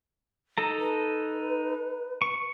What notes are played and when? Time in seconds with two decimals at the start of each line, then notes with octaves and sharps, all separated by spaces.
0.58 D#4 A4 A#5
0.80 B4
2.22 C#6